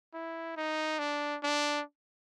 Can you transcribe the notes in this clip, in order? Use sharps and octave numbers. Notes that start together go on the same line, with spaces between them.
E4
D#4
D4
D4